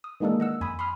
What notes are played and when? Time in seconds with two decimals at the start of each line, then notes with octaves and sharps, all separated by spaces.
0.04 D#6
0.20 D#3 E3 G#3 A#3 D4 A4
0.40 D#5 F#5 E6
0.61 F2 G#5 B5 D#6
0.79 B5 C6 D#6 F6